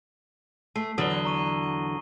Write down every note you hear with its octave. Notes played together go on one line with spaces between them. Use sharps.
A3 A5 C7
E2 D3 F#3 D#6 F#7 G7
A#5 C#6 D#7